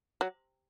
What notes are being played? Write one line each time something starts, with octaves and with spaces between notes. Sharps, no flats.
F#3